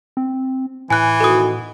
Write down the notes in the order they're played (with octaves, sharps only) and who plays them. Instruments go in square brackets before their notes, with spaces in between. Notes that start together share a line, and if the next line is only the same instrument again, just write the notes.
[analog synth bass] C4
[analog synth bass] A2 [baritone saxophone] E3 [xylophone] G#5 F#6
[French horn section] B2 D#3 F#4 [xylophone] A4 D#6